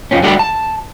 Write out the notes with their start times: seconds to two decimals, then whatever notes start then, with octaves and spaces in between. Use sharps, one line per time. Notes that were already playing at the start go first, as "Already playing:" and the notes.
0.11 F2 F3 C4 C#4
0.23 D3 G3 F#4 G4 A4 D5
0.39 A5